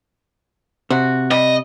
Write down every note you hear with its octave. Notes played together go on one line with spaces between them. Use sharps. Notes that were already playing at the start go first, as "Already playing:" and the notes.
C3 F#4
G3 D#5